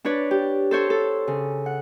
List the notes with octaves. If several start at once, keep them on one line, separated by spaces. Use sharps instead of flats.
D4 B4 C#5 D5
G4
A4 C5 C#5
A4
C#3
F#5